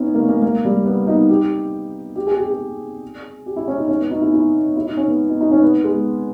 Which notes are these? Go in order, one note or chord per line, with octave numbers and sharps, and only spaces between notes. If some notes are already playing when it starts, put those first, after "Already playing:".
Already playing: B3 C#4 D#4 E4
A#3
A#3
A#3
G3
B3
D#4
G4
G4
G#4
G4
G#4
G4
E4
C#4
D#4
C#4
B3
D#4
E4
E4
E4
D#4
C#4
B3
D#4
D#4
C#4
B3
G#3